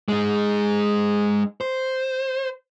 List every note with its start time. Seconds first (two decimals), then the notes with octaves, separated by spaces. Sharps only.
0.08 G#3 D#4
1.61 C5